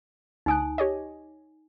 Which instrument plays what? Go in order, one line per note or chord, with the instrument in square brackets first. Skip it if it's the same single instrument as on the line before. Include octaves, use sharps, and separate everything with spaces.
[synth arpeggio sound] D2 D#6 F#6 [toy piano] D#4 G#5
[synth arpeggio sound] G4 C#5 D#5